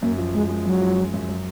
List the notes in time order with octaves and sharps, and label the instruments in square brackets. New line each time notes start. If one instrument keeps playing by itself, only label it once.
[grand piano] F#2 [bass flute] A#3
[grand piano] F3
[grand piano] F#2 [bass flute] G#3
[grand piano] G#3
[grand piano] F#2 [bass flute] F#3
[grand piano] F3
F3
F#2
F#3